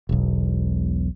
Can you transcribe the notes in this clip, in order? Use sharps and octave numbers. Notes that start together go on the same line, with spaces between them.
E1 B1